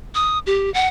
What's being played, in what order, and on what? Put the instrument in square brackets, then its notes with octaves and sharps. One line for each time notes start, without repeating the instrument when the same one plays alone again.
[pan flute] D#6
G4
F#5